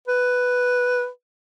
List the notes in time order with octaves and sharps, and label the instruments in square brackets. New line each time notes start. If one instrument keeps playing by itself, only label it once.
[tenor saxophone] B4